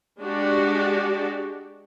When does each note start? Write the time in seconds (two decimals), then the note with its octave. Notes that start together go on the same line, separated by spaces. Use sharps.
0.20 G#3 D4 F#4 G4 D5